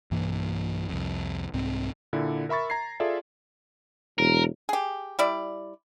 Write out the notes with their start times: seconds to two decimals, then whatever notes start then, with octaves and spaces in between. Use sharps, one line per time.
0.11 B1 G2 E3 A#3
0.89 C2 F2
1.54 C2 G#2 C4
2.13 A#2 D3 E4
2.49 A#4 E5 B5 C#6 A6
2.70 A#5 G#6 C7
3.00 F4 G#4 A4 D5 E5
4.18 E1 A#4
4.69 G4 G#4
5.19 G3 E4 D5